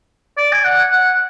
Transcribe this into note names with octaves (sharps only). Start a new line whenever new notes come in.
D5
G#5
F#5
F#5